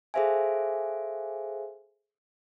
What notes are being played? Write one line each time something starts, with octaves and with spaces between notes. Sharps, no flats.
G#4 A4 C5 E5 F5 G#5